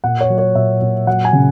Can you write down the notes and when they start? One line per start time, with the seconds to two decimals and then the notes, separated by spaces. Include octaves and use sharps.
0.04 A#2 F#5
0.21 C#5
0.30 F#3
0.38 C#5
0.55 A#2 E5
0.82 A#2
1.07 F#3 F#5
1.25 G#5
1.33 C#3